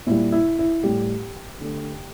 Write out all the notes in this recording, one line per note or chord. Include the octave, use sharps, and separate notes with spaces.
A#2 G3 E4
E4
E4
A2 G3 G4
D3 A3